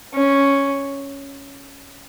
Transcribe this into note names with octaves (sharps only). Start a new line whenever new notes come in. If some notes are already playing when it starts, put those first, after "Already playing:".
C#4